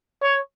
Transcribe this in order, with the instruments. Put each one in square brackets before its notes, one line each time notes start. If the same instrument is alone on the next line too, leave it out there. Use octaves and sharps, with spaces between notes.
[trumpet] C#5